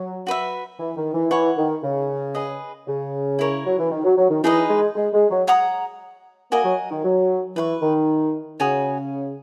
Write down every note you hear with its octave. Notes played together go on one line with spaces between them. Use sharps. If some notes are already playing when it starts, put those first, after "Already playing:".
Already playing: F#3
F#4 B4 E5
E3
D#3
E3
E3 C#5 F#5 C#6
D#3
C#3
G#4 B4 D#5
C#3
E4 A#4 C#5
F#3
E3
D#3
F#3
F#3
D#3
E3 D#4 G#4 B4 D#5
G#3
G#3
G#3
F#3
C#5 F#5 A#5 D#6
A#3 F#4 A#4 D#5 G#5
F#3
D#3
F#3
E3 B4 F#5 C#6
D#3
C#3 F#4 C#5 G#5 D#6